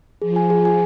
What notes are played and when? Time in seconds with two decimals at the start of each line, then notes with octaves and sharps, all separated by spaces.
0.21 F3 G#4
0.36 G#5
0.50 G#4
0.65 G#5